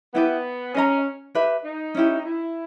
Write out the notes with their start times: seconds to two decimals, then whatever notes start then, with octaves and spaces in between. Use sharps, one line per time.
0.14 B3 E4 G4 B4
0.74 C#4 G#4 D#5 A#5
1.35 G4 B4 E5
1.65 D#4
1.95 C#4 E4 G4
2.25 E4